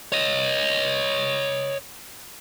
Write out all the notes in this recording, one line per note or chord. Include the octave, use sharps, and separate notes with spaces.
C#5 D#5